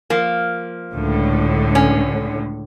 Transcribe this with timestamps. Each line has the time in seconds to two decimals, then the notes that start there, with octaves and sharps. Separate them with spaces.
0.10 F3 A#3
0.93 C#2 A2 D3
1.75 C#4